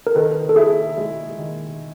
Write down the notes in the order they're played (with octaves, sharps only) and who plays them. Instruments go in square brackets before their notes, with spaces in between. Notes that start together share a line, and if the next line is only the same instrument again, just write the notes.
[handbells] A#4
[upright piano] D#3 [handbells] A4 B4
[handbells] A4
[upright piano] E4 [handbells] G#4
[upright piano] G#3
D#3